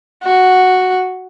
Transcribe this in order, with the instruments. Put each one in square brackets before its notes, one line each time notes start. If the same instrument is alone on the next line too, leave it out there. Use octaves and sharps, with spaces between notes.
[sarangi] F#4